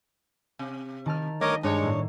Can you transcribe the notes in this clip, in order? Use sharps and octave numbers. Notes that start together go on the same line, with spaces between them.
C3
D#3 A5 F6
G2 A3 A#4 C#5 D#5 D6
G2 G#3 D4 C#5
A2 A#3